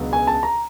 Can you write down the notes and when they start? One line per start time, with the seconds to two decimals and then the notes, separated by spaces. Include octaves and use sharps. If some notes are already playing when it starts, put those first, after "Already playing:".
Already playing: C#2 B2 F#3 B3 D4
0.13 G#5
0.27 A5
0.43 A#5